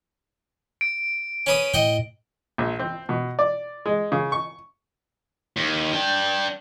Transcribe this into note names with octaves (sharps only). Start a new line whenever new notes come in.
D7
C#4 B4 D#6
A2 D#5 F#5 G5
A#1
C4
B2
D5
G#3
C#3
C#6
D#2
D4 G5